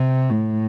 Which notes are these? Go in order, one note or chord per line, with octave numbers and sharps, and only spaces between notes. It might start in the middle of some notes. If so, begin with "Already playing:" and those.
Already playing: C3
A2